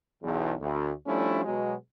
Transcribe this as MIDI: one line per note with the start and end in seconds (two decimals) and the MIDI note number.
0.23 0.53 35
0.23 0.53 40
0.60 0.92 38
1.07 1.43 53
1.07 1.43 55
1.07 1.43 57
1.07 1.43 61
1.07 1.43 62
1.07 1.43 64
1.45 1.74 47
1.45 1.74 54
1.45 1.74 56